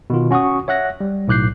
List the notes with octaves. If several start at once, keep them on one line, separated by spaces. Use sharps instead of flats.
B2 D#3 F4
C#4 F#4 F#5 C#6 D#6
C#5 E5 F#5 F#6 A#6
G3
B1 A2 D6 F#6 G6 C7